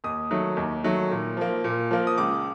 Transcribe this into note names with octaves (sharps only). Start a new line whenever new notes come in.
D#2 D#6
D#3 F#3 A3
D#2
D#3 F#3 A3
A#2
F3 A#3
A#2
F3 A#3
D#6
C#2 D6